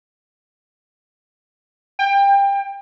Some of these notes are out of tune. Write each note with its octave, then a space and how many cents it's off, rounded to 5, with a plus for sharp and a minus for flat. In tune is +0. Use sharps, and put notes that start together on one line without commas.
G5 +25